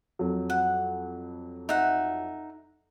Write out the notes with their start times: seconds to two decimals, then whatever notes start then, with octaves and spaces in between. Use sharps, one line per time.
0.19 F2 F#3
0.50 F#5
1.69 D#4 E5 F#5